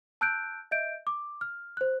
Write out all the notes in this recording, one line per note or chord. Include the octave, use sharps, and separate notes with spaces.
A5 E6 F#6 G6 D7
D#5 E5 G6 D7
D6
F6
C5 F#6